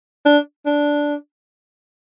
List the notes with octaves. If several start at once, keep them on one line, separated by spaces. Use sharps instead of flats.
D4
D4